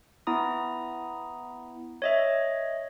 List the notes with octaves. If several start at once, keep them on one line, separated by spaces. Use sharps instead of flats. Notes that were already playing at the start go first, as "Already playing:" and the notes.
B3 E4 A#5 D#6
C#5 D#5 E5